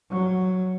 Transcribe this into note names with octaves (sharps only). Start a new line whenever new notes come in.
F#3